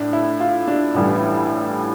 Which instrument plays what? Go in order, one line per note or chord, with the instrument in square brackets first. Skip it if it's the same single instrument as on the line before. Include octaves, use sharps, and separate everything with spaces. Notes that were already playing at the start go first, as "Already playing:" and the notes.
Already playing: [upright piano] A2 [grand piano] D4
[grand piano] E4
F4
D4
[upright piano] A1 A2 E3 G3